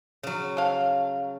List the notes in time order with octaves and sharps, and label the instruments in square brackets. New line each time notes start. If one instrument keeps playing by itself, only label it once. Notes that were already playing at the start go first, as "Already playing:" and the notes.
[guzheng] C#3 F#3
[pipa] A4 F5